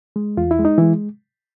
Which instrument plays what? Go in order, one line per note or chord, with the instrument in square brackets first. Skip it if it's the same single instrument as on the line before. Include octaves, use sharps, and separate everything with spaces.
[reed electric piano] G#3
E2 F4
E4
G#3
D#4
E3 G#3 E4